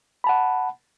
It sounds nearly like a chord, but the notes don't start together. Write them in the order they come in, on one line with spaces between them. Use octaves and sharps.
B5 A5 F#5